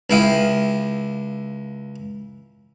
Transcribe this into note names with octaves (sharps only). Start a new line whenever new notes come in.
C#2 E4 F5 G5 D#6